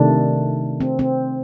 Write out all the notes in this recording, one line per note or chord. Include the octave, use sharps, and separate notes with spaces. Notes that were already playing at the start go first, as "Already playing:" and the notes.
Already playing: C3 D#3 A3 D4
C4
C4